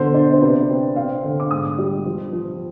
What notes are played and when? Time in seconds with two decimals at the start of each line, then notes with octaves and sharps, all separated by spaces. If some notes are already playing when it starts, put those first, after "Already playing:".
Already playing: B2 D3 C5
0.14 D4
0.33 C5
0.42 C3 B4
0.70 C4
0.96 C4 F5
1.24 D3
1.40 D6
1.51 G#2 D#6
1.78 G3
2.06 F3
2.33 F3